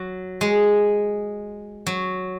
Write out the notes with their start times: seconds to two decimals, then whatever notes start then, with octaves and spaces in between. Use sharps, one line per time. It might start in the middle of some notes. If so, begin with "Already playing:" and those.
Already playing: F#3
0.41 G#3
1.87 F#3